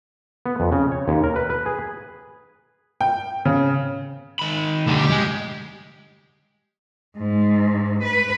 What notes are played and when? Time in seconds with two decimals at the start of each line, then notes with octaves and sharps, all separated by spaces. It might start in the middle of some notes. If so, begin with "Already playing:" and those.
0.46 B3
0.60 F2
0.72 C#3
0.92 C#5
1.08 D#2
1.24 A#4
1.36 B4
1.50 B4
1.66 G#4
3.01 G5
3.45 C#3
4.39 D#3 B5
4.87 D2 D3 G3
4.98 G4
5.10 G#3
7.17 G#2
8.02 B4